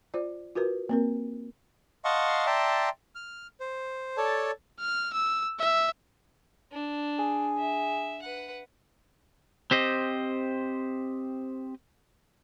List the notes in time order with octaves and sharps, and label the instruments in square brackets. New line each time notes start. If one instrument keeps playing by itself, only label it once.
[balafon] F4 C5 D5
F4 F#4 A#4 B4
A#3 C4 A#4
[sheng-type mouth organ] D#5 F5 F#5 A5 C6 C#6
D5 E5 G5 A5 A#5 C6
F6
C5
A4 C#5 D5 A5
[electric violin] F6
E6
E5
[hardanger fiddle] D4
[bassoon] G#4
[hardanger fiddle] E5
B4 F#5
[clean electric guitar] C4 G4 C5 D#5